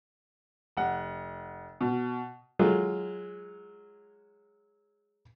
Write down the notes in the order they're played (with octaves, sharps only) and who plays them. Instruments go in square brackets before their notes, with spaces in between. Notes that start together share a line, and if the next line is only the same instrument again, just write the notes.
[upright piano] F1 F#5
B2
[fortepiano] F#3 G#3 F4